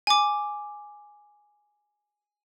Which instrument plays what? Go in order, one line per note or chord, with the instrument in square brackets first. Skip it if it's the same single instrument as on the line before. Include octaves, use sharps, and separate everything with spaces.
[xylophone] G#5 D6